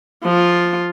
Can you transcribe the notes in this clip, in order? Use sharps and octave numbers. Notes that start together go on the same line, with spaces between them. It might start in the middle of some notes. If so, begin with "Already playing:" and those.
F3 F4